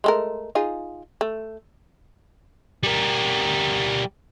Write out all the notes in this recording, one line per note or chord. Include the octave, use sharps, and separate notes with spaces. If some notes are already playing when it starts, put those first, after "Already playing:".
G#3 A3 A#4
D#4 F4 G#4
A3
G3 A#4